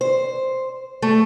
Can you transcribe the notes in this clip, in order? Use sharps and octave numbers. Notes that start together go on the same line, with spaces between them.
C5
A3